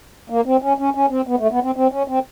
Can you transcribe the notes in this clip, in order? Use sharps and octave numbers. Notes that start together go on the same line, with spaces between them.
A#3
C4
C#4
C#4
C#4
C4
B3
A3
B3
C4
C4
C#4
C4